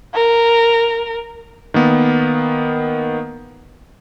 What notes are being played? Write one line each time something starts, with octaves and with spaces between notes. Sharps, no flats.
A#4
D#3 A#3 B3